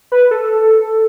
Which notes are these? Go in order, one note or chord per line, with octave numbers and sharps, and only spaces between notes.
B4
A4